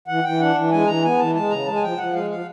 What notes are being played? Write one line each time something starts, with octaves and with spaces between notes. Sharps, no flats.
E3 F#5
E3 G5
D4 F#5
E3
G#3 G#5
E3 A#5
B3 G#5
E3 A5
G#3 A5
C#3 A#5
G#3 A5
G#5
F3 G5
F3 F#5
G#3 F5
F3 F5